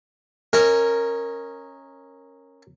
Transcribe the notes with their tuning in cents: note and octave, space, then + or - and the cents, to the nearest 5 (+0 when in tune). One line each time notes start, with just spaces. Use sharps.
C#4 -15 A#4 -5 D#5 +20